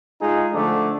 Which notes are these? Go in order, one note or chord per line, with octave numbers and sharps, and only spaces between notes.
G#3 D#4 F4 G#4
D3 F3 A3 D4